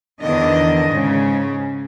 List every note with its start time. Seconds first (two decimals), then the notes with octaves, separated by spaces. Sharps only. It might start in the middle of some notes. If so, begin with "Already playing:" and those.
0.22 E2 D3 D#3 D4 D#5
0.91 G#2 C#3